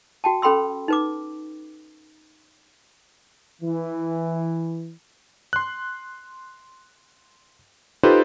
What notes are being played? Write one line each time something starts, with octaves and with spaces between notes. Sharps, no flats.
F#4 G5 A5
C#4 A4 G5 B5 C6 E6
D#4 B4 D6
E3
C6 F#6
D#4 F4 G4 A4 B4 C5